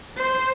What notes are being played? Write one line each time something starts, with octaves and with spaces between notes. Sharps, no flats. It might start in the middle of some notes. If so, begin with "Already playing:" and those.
C5